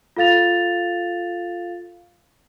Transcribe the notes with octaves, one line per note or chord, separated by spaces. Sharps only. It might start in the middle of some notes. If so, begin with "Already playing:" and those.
F4 A4 F5 A6 F7